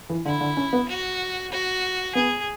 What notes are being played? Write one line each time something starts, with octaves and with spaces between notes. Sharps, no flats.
E3
D3 E4
D3
C#4
B3
F#4
F#4
B3 G#4